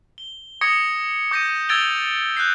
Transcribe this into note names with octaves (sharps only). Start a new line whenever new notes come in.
G7
D6 D#6 G#6 A#6 C#7
D6 G6 A#6 C#7 D#7
E6 G#6 A6 D7 F7 G7
F#6 G6 C7